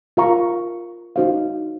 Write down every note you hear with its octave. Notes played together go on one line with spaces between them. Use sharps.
F4 A#4 F5 A#5 C#6
D#4 F#4 C5 F5